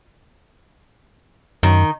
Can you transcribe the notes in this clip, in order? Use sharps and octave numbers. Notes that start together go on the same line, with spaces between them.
F#2 D#3